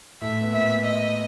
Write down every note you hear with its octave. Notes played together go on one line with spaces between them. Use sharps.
A2 A3 E5
B3
A#2 A#3 E5
D#5